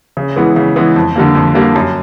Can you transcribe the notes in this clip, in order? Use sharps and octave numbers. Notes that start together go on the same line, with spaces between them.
C#3
E3 G#3 B3
C#3
E3 G#3 B3
F2
D3 G3 A#3
F2
D3 G3 A#3
F#2